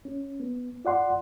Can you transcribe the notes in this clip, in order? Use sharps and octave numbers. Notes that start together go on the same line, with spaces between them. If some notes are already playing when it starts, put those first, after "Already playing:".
C#4
B3
F4 D5 F#5 C6